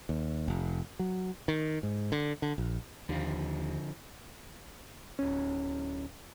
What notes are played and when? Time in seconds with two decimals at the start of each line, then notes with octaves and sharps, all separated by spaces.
0.09 D#2
0.48 F1
0.99 F#3
1.48 D#3
1.83 G#2
2.12 D3
2.42 D3
2.58 A#1
3.09 D#2 D3 F3
5.19 D1 C#4